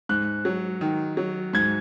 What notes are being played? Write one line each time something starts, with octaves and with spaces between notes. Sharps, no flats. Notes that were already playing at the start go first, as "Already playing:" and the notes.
G#2 F#6
F#3
D#3
F#3
G#2 G#6